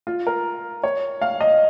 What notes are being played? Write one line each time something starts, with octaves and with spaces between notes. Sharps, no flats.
F4
A#4
C#5
F5
D#5